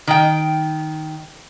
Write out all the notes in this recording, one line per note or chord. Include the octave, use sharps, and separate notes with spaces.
D#3 G5